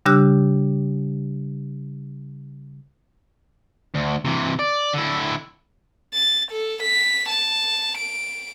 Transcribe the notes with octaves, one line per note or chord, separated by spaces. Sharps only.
C#3 G3 D4 G4 E6 F#6
D2
C3 E3
D5
D3 E4
A6
A4
B6
A5
D7